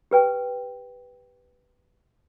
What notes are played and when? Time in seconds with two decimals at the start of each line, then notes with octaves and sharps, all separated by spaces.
0.11 G4 B4 G5